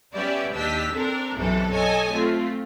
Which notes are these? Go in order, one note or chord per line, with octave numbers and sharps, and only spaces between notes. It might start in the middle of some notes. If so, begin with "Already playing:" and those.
G3 B3 C#4 G4 D5 E5
D#2 D4 G4 D#5 E6 B6
C4 D4 A4 A#4
B1 F#2 C3 E3 A4
A4 C#5 D#5 G#5 A5
A3 C4 F4